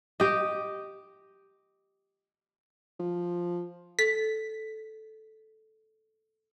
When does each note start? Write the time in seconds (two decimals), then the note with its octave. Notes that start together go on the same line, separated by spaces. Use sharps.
0.20 G4 D#5
2.99 F3
3.99 A4 B6